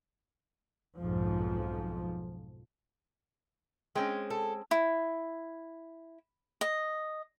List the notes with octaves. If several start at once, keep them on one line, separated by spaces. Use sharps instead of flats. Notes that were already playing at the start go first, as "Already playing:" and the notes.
B1 F2 G#2 F3
G#3 C4 C#4 G5
A4
E4
D#5